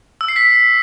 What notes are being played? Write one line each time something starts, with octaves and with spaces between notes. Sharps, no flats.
E6
C7
B6